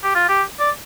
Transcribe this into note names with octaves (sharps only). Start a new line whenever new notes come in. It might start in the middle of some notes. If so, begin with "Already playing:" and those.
G4
F4
G4
D5